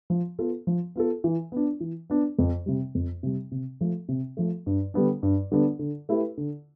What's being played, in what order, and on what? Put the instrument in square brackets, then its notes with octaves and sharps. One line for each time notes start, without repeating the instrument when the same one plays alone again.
[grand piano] F3
B3 F4 A4
F3
B3 F4 A4
E3
B3 D4
E3
B3 D4
F2
C3 G3
F2
C3 G3
C3
F3 A3
C3
F3 A3
G2
D3 G3 B3 D4
G2
D3 G3 B3 D4
D3
A3 E4 G4 B4
D3